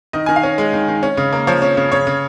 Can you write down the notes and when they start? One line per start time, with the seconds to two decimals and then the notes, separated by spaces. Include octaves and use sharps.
0.13 D#3 D#5
0.26 D#3 G#5
0.36 F5
0.43 C#4
0.58 G#3
0.73 D#3
0.88 D#3
1.03 C#4
1.17 C#3
1.33 A#3
1.47 F3 C#5
1.62 C#4
1.77 C#3
1.92 C#3 C#5
2.07 C#3